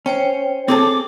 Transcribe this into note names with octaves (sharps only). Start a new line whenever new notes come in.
C#4 C5 C#5 G5
C4 G#4 A4 D6